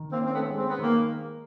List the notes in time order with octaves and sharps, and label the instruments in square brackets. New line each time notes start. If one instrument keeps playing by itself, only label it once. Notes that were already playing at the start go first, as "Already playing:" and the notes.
Already playing: [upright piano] D#3
[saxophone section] A#3 C4
[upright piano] C#4
[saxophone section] C4
A3 B3
[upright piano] G#3
[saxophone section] C4
B3
[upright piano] D#3 [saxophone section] A#3